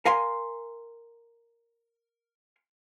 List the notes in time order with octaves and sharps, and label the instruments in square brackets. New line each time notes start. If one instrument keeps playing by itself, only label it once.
[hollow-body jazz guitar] A#4 F5 G#5 C6